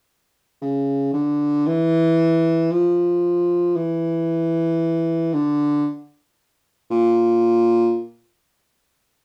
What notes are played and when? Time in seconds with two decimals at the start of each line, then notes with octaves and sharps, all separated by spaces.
0.62 C#3
1.14 D3
1.67 E3
2.71 F3
3.75 E3
5.33 D3
6.91 A#2